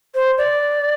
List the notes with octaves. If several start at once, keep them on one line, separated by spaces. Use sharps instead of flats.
C5
D5